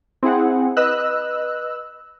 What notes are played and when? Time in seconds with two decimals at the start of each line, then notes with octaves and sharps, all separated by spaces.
0.23 C4 E4 G#4 F#5
0.77 B4 D#5 E6 F#6